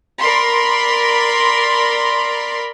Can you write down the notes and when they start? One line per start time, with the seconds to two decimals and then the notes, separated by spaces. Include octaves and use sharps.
0.20 A#4 D5 B5 C6